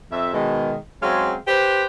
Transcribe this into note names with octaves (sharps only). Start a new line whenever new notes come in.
F2 E5
B2 D#3 G#3
F#3 G#3 C4 C#4 G#4 F5
G4 B4 C5